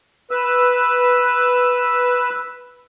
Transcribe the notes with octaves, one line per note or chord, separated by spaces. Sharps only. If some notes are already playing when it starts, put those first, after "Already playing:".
B4 E6